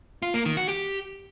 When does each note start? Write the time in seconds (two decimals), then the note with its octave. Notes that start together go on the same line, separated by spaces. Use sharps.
0.22 F4
0.34 A#3
0.45 D#3
0.57 F#4
0.69 G4